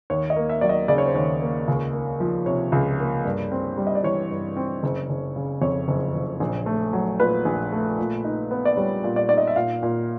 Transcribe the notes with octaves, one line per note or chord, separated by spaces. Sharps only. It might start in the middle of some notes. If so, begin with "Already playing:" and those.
D#2 C#5
D#5
A#3
E5
F#3 D5
D#5
C#3 D5
C#5
C5
D#2 C#5
A#3
C#2
A#3
F3
C3 C#5
C#2
A#3
G2
C4
G3
D#5
D5
E3 C#5
G2
C4
F#1
F#1
C#3
F2 C#5
F#1
F#1
A#1
A3
F#3
A#2 B4
A#1
A3
A#2
D#4
B3
D5
G3 C#5
A#2
D5
D#4 D5
D#5
E5
A#2 F5
A#2